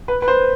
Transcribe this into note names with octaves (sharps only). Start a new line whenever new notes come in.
B4
B4
C5